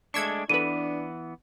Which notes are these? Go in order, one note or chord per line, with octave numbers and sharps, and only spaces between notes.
G#3 A3 D4 C#6 E6 G#6
E3 B3 D4 A4 B4 D#7